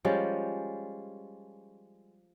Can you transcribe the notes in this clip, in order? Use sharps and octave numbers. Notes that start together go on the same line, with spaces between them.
F3 G3 G#3 C#4